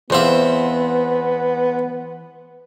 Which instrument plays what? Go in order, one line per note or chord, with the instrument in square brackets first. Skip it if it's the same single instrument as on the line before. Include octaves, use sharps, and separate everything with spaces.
[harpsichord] E2 C4 E5 [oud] E3 C5 F5 [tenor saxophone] B3